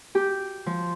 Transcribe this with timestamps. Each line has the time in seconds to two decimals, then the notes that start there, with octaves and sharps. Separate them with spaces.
0.15 G4
0.66 F3